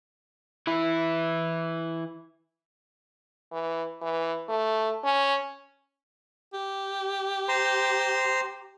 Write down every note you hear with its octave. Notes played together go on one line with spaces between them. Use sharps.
E3 E4
E3
E3
A3
C#4
G4
C5 A#5 C6